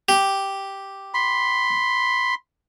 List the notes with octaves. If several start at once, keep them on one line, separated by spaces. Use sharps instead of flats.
G4
B5 C6